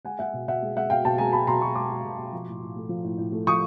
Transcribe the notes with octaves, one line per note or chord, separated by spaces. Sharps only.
G#3 F#5 G#5
G#3 E5 F#5
B2
B2 E5 F#5
G#3
G#3 E5 F#5
B2 F5 G5
B2 G5 A5
G#3 G#5 A#5
G#3 A5 B5
B2 A#5 C6
B2 B5 C#6
G#3 C6 D6
G#3
B2
B2
F3
A2
A2
A3
F3
A2
A2
A3
F3 C#6 D#6